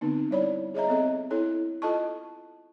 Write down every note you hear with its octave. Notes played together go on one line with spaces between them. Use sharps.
D3 B3 C4 D#4
G3 E4 C#5 D5 B5
G#4 C#5 D#5 E5 A#5
B3 C4 A4 D#5
E4 A4 C#5
F4 A4 D#5 A5 C#6